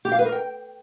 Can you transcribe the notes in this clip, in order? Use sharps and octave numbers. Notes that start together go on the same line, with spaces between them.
G4
F5
B4
A#4
G5